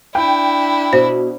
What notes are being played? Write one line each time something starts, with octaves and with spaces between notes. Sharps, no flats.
D4 E4 G5
B2 C5